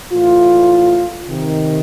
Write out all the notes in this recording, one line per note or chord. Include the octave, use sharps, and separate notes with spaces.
A2 E3 F4
C3 D#3